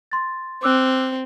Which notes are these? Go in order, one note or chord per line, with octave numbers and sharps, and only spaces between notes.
C6 A6
C4 D6 E6 F#6